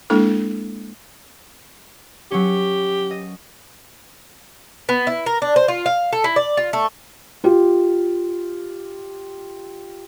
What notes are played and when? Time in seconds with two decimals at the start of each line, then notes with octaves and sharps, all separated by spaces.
0.10 G#3 A#3 D4 E4 A4
2.32 F#3 C#4 G4
3.10 D#5
4.89 B3
5.07 E4
5.26 A#4
5.42 D4
5.56 C5
5.68 F4
5.86 F5
6.13 A4
6.24 E4
6.36 D5
6.57 F4
6.73 A3
7.44 F4 G4